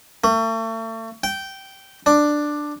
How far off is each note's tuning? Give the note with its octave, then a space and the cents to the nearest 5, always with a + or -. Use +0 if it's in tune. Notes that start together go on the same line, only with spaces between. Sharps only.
A3 +40
G5 -15
D4 +10